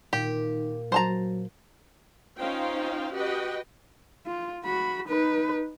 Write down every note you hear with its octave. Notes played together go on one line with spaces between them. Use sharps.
A#2 D#3 G4
F#3 C5 A5 A#5
C#4 D#4 F4 C5 F5 G5
F#4 G4 B4 D#5 G5
F4
F#4 B5
D#4 B4